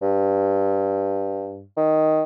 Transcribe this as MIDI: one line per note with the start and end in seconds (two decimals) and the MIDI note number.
0.02 1.66 43
1.77 2.23 51